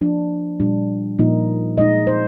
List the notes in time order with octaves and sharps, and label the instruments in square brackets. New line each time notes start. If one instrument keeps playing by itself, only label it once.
[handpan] F3 A#3 D4
A#2 G3 D4
A#2 F3 A#3 D#4
A#2 G#3 D#4 D#5
C5